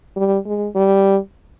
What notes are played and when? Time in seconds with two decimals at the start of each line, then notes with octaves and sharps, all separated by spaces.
0.16 G3
0.46 G#3
0.75 G3